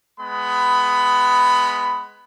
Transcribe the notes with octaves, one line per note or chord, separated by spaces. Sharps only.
G#3 B3 B5